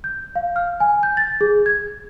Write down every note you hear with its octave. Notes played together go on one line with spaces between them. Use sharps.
G6
F5
F6
G#5
G6
A6
G#4
G#6